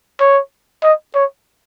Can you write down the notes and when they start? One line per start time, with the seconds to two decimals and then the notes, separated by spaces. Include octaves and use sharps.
0.20 C#5
0.83 D#5
1.15 C#5